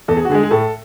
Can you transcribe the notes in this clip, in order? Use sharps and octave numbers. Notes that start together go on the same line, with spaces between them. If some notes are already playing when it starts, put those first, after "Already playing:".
E2 A4
G#4
F#4
D3 G#4
G#3
G#4
A2 A4